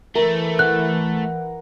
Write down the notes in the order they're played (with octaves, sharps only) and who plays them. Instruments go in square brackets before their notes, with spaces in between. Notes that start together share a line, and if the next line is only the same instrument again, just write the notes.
[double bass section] E3 [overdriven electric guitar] A3 [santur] A#4
[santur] F#5 [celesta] F#6